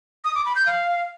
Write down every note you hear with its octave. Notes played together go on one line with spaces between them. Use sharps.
D#6
D6
B5
G6
F5